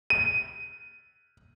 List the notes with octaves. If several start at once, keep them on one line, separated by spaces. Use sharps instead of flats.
D#7